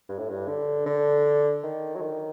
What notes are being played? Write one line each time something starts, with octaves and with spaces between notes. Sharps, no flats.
G2
A2
G2
D3
D3
D#3
F#3
D#3